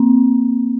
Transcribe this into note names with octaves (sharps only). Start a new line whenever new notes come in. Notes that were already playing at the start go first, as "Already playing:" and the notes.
Already playing: A#3 C4